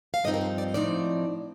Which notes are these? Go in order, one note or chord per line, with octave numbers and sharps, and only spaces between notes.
F5
G2 F3 C4 D#4 D#5
A#4
C5
D5
A2 F3 C4 D#4 D5